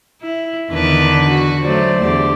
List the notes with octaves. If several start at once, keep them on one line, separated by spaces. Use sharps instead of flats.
E4
E2 D3 D#3 D4 B4
F#4
F#3 A3 C5 D5
E2 D3 G4